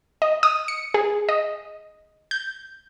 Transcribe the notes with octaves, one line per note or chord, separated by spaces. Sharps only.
D#5
D#6
C#7
G#4
D#5
G6